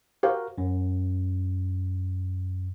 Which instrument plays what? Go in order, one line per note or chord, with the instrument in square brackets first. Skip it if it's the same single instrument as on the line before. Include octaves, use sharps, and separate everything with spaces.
[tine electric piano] F#4 A#4 [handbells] G4 C5 F5
[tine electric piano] F#2